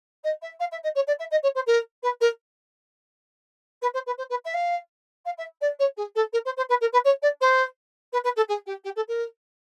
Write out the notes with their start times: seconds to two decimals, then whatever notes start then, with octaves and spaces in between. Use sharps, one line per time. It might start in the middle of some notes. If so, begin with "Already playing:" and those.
0.23 D#5
0.41 E5
0.59 F5
0.71 E5
0.83 D#5
0.95 C#5
1.07 D5
1.19 E5
1.31 D#5
1.43 C#5
1.55 C5
1.66 A#4
2.03 B4
2.20 A#4
3.82 B4
3.94 C5
4.06 B4
4.18 C5
4.29 B4
4.45 E5
4.53 F5
5.25 F5
5.37 E5
5.61 D5
5.79 C#5
5.97 G#4
6.15 A4
6.32 A#4
6.45 C5
6.57 C5
6.69 B4
6.81 A#4
6.92 B4
7.04 C#5
7.22 D5
7.41 C5
8.12 B4
8.24 B4
8.36 A4
8.48 G#4
8.66 G4
8.84 G4
8.96 A4
9.08 A#4